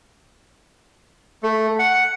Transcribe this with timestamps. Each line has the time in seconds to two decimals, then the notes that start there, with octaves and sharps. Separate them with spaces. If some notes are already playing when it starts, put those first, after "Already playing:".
1.43 A3
1.79 F#5